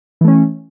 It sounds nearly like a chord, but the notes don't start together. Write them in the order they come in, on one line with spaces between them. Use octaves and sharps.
E3 A3 C#4